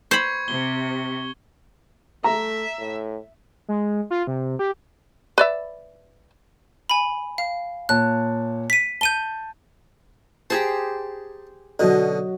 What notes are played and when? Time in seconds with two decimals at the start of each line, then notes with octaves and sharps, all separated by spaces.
0.11 C5 B5 C#6 G#6 C#7
0.48 C3 G7
2.24 A3 E5 A#5
2.79 A2
3.68 G#3
4.11 F4
4.27 C3
4.59 G4
5.38 B4 D5 E5
6.90 G#5 B5
7.38 F5
7.89 A#2 C#5 A5 F#6
8.70 B6 D#7
9.01 A5 G6 D#7 G7
10.50 G4 G#4 C5 A5 A#5
11.79 B2 D3 F#3 F#4 D#5